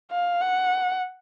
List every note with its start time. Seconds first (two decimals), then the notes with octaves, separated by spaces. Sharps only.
0.11 F5
0.41 F#5